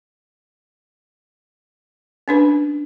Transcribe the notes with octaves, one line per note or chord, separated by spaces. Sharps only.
C#4 D4 B4